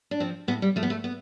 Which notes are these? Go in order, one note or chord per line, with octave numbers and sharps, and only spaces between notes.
D4
F3 C4
A2 B3
G3
F3 A3
B3
A3
B3